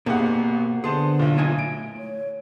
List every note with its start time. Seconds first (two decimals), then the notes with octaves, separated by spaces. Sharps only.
0.06 G#1 B2 A#3 G4 G#4 F#5
0.84 D3 B3 G#4 C5 A5 C6
1.19 B1 A#2
1.38 E4 D#5 G#5
1.59 A3 D7
1.97 C#5